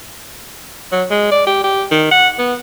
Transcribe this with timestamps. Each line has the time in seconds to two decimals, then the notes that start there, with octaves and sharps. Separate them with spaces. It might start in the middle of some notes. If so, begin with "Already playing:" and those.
0.92 F#3
1.10 G#3
1.32 D5
1.47 G4
1.64 G4
1.91 D#3
2.12 F#5
2.39 B3